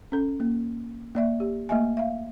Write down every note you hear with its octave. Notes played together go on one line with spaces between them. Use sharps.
C#4 A4
A#3
A#3 D5 E5
G4
A3 A#3 D#5 E5 G#5
E5 F5